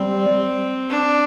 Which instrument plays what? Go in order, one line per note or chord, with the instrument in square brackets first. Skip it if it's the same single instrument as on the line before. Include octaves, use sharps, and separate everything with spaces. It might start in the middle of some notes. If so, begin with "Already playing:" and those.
Already playing: [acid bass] G3 [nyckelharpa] C4
[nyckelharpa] D4